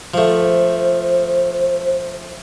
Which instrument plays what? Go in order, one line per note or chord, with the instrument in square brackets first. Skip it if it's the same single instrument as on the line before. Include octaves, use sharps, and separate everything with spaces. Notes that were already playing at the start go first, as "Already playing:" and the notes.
[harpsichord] F3 A3 [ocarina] C5